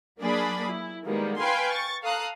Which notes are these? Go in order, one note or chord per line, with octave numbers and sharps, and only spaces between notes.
F#3 A#3 D4 G#4 D5 B5
E4
D#3 G3 G#3 A#3 B3
B4 F5 G5 G#5 B5 C6
C#6 A6
A4 F5 A#5 D#6 F#6